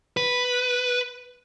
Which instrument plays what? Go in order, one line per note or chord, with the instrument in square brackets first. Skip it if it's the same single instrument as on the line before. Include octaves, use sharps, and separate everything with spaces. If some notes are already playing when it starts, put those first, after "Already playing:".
[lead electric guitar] B4